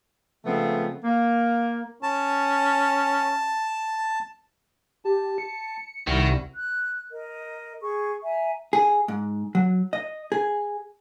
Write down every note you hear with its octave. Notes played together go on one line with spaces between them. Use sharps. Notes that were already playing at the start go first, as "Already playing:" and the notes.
C#3 F3 G#3 A3 B3 C4
A#3
C#4 A5
G4 A5
C#7
C2 D#3 G3 E4 F#4
F#6
A#4 D#5
G#4 C#6
E5 G#5 A#5
G#4
G#2
F#3
D#5
G#4